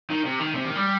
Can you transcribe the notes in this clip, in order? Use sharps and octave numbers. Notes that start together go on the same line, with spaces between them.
D#3
C3
D#3
C3
D#3
G3